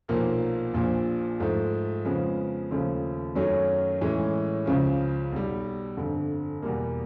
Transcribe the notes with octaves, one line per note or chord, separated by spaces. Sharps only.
B1 A#2 F3 A#3
A#1 A#2 F3
G#2 F3 A3
F2 C#3 F3 G#3 B3
D#2 C#3 F3 A3
F#2 D#3 F#3 A3 C#4
A2 E3 G#3 C#4
C#2 C#3 F3
B1 B2 G3
G1 F2 D3
E2 B2 G3 A#3